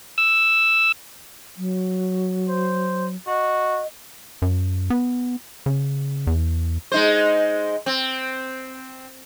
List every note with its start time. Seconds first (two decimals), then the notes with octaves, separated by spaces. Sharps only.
0.18 E6
1.57 F#3
2.49 C5
3.27 F#4 D#5
4.42 F#2
4.90 B3
5.66 C#3
6.27 E2
6.92 G#3 D#4 C5
7.86 C4